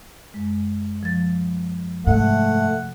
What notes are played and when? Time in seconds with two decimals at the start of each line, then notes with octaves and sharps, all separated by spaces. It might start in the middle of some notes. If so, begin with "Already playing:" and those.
0.34 F#2 G#3
1.03 F3 A6
2.07 G#2 C3 A3 F#5